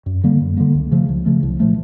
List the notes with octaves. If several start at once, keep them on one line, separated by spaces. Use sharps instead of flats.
F#2
D3 G3 A#3
F#2
D3 G3 A#3
C#2
C#3 F3 A3
C#2
C#3 F3 A3
C2
A#2 F3 A3